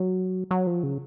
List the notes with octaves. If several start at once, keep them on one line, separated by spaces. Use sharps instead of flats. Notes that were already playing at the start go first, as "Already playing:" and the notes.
Already playing: F#3
F#3
F3
C#3